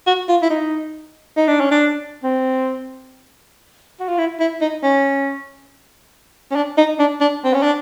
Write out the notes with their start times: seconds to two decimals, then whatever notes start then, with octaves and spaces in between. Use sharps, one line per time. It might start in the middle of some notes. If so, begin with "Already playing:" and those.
0.07 F#4
0.29 F4
0.42 E4
0.50 D#4
1.37 D#4
1.48 D4
1.60 C#4
1.71 D4
2.23 C4
4.00 F#4
4.09 F4
4.18 E4
4.40 E4
4.61 D#4
4.83 C#4
6.51 C#4
6.55 D4
6.78 D#4
6.99 D4
7.21 D4
7.44 C4
7.54 C#4
7.63 D4